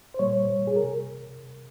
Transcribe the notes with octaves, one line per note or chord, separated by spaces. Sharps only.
C5
A#2 G3 A#3 C#5
G#4
A#4
C3